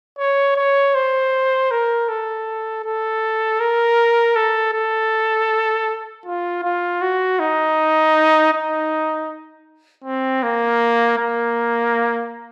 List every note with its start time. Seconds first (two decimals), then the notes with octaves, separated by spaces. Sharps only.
0.19 C#5
0.57 C#5
0.95 C5
1.71 A#4
2.09 A4
2.85 A4
3.60 A#4
4.36 A4
4.74 A4
6.26 F4
6.63 F4
7.02 F#4
7.40 D#4
8.53 D#4
10.04 C4
10.43 A#3
11.18 A#3